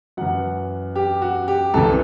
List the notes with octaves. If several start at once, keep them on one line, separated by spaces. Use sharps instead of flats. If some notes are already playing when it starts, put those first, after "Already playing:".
F#2 E3 F#5
G4
F#4
G4
C2 C3 E3 A4